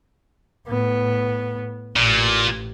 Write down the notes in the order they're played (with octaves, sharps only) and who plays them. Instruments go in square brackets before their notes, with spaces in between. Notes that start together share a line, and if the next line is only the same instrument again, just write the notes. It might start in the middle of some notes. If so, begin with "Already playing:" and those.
[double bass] A2 B3
[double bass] A1 [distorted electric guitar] A#2